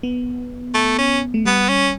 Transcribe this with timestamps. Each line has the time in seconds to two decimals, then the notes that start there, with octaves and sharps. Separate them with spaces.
0.03 B3
0.74 A3
0.98 C#4
1.34 A3
1.45 G3 B3
1.69 C#4